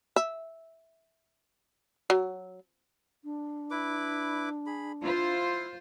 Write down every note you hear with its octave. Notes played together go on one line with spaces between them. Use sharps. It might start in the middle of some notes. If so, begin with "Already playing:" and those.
E5
F#3
D4
E4 B4 D6
G#4 B5
E4 F4 C5